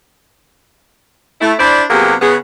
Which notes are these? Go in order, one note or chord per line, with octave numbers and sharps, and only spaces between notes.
A3 E4
D4 E4 C5 D5
C3 F#3 A#3 B3 G4 G#4
C#3 B3 G#4